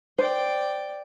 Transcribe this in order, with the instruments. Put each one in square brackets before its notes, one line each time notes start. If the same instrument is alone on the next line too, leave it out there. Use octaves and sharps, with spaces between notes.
[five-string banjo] C5 [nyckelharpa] D5 G5